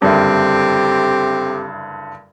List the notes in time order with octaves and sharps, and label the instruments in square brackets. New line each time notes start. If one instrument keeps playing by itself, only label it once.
[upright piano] F#1 D2 G2 [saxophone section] C4 G4 A4